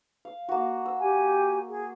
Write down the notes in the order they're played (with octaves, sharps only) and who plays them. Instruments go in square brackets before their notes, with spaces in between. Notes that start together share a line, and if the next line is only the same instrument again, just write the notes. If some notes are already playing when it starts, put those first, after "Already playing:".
[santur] F5
A#3 F#4
E6
[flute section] G4 G#5
G#4